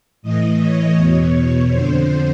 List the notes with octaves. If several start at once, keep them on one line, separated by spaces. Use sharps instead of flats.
A2 E3 D#5
C#5
E2 B2
F2 D3 C5